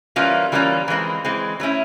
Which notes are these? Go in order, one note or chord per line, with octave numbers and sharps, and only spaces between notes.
E3 G3 A#3 C#4 F4
E3 G3 A#3 C#4 F4
E3 G#3 C4
E3 G#3 C4
F#3 A3 C#4 E4